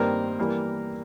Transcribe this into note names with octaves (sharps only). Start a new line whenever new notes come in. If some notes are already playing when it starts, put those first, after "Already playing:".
Already playing: G2 D#3 G3 A#3 C4 A#4
E3 G3 A#3